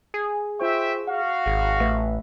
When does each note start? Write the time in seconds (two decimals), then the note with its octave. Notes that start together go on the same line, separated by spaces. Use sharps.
0.14 G#4
0.60 F4 C5 E5 G5 C#6
1.07 F#4 F5 F#5
1.46 G#1 G#4
1.80 A1 A3 B4 E5